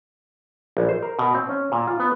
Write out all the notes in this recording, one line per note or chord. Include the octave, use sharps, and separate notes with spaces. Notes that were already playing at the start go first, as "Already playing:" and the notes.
A#1
C5
A#4
B2
C4
C#4
A#2
F4
B3